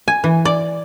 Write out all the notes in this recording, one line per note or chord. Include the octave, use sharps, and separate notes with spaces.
G#5
E3
D5